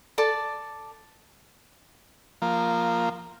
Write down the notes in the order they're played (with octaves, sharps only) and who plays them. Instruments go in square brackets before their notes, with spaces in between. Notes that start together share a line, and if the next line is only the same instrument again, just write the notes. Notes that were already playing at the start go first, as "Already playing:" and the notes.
[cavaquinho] A4 D5 A5
[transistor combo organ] F3 A#3